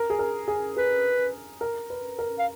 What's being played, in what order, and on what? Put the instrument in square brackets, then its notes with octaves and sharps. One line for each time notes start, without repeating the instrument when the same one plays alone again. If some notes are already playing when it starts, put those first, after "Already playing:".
Already playing: [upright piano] A#4
G#4
A#4
G#4
[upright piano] G#4 [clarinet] B4
[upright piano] A#4
B4
A#4
[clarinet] F5